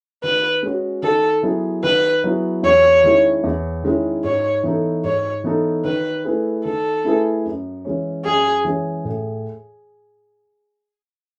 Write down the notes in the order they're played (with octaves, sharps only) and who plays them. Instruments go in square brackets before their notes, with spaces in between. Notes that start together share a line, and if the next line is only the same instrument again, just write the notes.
[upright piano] D#3 [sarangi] B4
[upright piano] G#3 C#4 F#4
[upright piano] D#3 [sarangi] A4
[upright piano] F#3 B3 E4 G#4
[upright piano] D#3 [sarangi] B4
[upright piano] F#3 B3 E4 G#4
[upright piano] E2 [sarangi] C#5
[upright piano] D#3 G#3 C#4 E4
E2
D#3 G#3 C#4 E4
[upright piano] G#2 [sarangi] C#5
[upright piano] E3 B3 D#4 A4
[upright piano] G#2 [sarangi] C#5
[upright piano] E3 B3 D#4 A4
[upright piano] D#3 [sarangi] B4
[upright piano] A3 E4 G#4 B4
[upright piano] D#3 [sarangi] A4
[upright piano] A3 E4 G#4 B4
F#2
E3 G#3 C#4
[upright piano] F#2 [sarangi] G#4
[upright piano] E3 G#3 C#4
A2